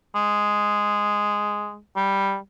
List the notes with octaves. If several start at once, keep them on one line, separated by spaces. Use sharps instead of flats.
G#3
G3